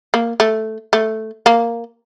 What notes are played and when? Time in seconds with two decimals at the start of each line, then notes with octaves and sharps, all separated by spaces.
0.14 A#3
0.40 A3
0.93 A3
1.46 A#3